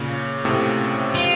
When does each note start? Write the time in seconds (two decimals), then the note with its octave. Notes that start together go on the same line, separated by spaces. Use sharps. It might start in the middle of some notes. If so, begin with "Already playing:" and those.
Already playing: A#2 C#3
0.45 A2 C3
1.15 F4